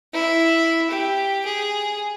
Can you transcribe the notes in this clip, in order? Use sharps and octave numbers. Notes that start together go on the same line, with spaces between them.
E4
G4
G#4